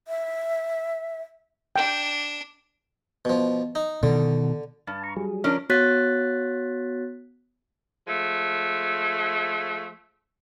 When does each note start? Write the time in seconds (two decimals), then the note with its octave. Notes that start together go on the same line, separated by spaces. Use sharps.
0.08 E5
1.76 D4 G5
3.25 B2 F3
3.75 D#4
4.03 B2 D3 D#3
4.87 G2 A5
5.04 A#5 C#6
5.16 F#3 G3 G#4
5.44 F3 C#4 D4 A#4
5.69 B3 F#4 C#5 F#6 A6 B6
8.08 F3 G#3 A3